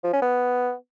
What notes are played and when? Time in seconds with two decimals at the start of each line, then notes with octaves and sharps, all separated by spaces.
0.04 F3
0.13 C#4
0.22 B3